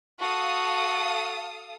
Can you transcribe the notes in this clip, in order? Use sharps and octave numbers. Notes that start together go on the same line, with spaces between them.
F#4 A4 F5 D#6